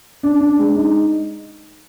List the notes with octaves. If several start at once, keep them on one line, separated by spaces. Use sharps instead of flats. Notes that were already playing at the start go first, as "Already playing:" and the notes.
D4
D4
G#3
D#4